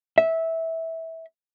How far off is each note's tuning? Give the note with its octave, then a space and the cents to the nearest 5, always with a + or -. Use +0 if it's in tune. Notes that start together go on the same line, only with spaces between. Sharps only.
E5 -15